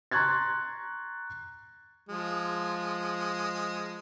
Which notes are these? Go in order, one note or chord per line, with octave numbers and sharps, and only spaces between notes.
A#5 C6 C#6 F#6 G#6 A6
F3 G#3